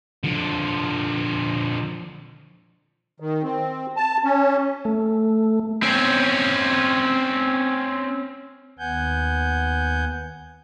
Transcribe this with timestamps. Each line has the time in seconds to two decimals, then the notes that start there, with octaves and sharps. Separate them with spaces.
0.24 D3 F3
3.20 D#3
3.43 C4
3.96 A5
4.24 C#4
4.85 A3
5.83 C4 C#4
8.79 D#2 B3 F#5 G#5 G6